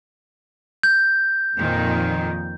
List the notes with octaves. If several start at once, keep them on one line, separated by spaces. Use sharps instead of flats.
G6
F2 A#2 D#3